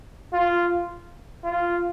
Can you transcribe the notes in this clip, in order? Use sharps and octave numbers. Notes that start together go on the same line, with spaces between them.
F4
F4